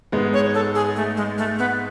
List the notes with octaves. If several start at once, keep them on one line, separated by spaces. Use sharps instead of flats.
G#2 G#3 B3
C#5
A4
G#4
A3
G#3
A3
B3